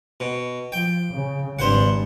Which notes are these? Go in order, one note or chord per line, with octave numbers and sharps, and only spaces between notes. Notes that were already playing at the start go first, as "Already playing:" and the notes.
B2
F3 G5
C#3
G#1 G2 G3 C5 F#5